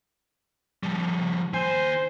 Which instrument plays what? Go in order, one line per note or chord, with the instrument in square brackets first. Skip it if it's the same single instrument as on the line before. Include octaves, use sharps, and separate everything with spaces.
[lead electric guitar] F3 G3
[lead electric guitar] D#2 G#5 [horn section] C5